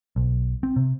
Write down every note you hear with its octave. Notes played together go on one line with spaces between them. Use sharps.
B1
C4
C3